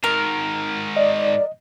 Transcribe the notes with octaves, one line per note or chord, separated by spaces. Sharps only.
G#2 D#3 A#4
D5 D#5